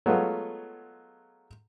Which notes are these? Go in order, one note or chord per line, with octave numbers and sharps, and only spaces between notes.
F#3 G#3 A3 B3 F4